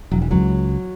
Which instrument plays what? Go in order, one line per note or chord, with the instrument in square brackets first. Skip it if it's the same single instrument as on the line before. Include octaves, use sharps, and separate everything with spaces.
[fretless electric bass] E1 [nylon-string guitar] F#3
[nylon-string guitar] E3
[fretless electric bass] C#2 [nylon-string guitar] F#3